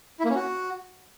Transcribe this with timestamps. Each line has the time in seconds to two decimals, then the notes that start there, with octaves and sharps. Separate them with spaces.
0.20 E4
0.25 A#3
0.30 C#4
0.35 F#4